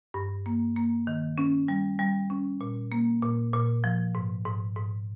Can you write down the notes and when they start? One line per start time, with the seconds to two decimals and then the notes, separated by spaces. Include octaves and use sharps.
0.14 G2
0.46 A#3
0.77 A#3
1.07 D#3
1.38 C#4
1.68 G3
1.99 G3
2.30 C#4
2.61 A#2
2.92 A#3
3.22 A#2
3.53 A#2
3.84 F3
4.15 G#2
4.45 G#2
4.76 G#2